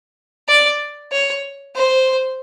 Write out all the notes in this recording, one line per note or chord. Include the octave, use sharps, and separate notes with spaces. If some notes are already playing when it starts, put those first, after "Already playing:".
D5
C#5
C5